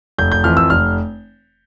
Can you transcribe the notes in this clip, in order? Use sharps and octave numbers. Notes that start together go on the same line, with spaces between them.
F1 G6
G6
F2 E3 F6
E6
F1 F6